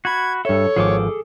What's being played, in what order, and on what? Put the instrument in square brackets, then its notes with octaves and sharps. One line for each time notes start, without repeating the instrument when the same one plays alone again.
[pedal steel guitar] F#4 B5 [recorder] G#6
[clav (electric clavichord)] G2 E5 [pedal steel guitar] A4 [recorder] C#5
[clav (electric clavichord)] G#1 F3 [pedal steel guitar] G#4 A4 D6